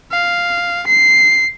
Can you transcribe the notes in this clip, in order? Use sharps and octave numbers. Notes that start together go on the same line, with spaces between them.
F5
C7